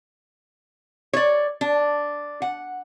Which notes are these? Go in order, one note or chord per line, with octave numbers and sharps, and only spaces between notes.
C#5 D5
D4
F#5